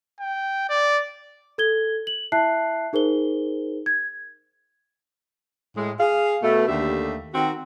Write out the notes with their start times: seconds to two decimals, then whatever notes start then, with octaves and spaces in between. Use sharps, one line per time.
0.20 G5
0.69 D5
1.58 A4 G#6 G7
2.07 F#7
2.32 E4 E5 A5 F#6 C7
2.93 D#4 G#4 A#4 C5 G7
3.86 G#6
5.76 A2 G#3
5.99 G#4 F5
6.43 B2 A3
6.68 D#2 D3 A3 G4 E5
7.34 D#3 C4 F#4